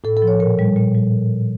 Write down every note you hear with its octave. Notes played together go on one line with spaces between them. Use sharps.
A2 A4
A4
F3
C#5
A#2 A#4
G3
A#2
G3